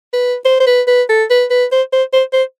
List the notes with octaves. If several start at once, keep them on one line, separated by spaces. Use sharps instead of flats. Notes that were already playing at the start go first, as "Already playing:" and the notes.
B4
C5
C5
B4
B4
A4
B4
B4
C5
C5
C5
C5